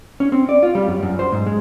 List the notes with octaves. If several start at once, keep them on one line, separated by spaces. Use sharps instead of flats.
C#4
C4
D5
F4
G3
F#2
F#2
C5
G#2
G#3